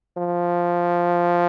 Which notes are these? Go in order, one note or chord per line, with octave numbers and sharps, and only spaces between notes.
F3